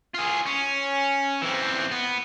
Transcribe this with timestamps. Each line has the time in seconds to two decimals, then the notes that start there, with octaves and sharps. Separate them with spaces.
0.14 F4 G#4
0.46 C#4
1.42 E3 C4
1.91 B3